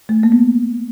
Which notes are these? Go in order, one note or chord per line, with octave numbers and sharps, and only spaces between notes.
A3
A#3
B3